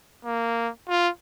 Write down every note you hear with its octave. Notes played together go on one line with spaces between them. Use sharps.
A#3
F4